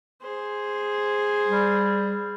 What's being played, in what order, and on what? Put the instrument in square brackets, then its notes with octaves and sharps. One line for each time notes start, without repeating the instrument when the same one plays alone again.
[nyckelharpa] G#4 C5
[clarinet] G3